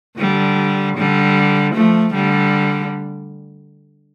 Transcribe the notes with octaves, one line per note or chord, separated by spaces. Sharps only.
D3 G3
D3 G3
F3 A3
D3 G3